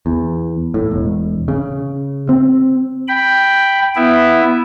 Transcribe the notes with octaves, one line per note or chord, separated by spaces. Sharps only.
E2
A2
E1
C#3
C4
G5 B5
B3 E4 E5